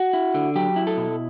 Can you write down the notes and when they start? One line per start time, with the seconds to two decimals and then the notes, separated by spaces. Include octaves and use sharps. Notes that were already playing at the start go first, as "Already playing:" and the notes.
Already playing: F#4
0.13 E4
0.34 D3
0.56 F#3 G4
0.76 E4
0.87 A4
0.97 B2